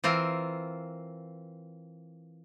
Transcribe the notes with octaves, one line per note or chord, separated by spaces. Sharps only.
E3 C4 F4 A#4